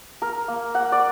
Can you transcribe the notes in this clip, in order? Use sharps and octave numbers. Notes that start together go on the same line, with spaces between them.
A#4
A#3
F#5
D5